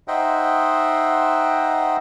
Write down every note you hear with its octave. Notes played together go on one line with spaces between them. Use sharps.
D#4 C5 D#5 E5 F#5 G5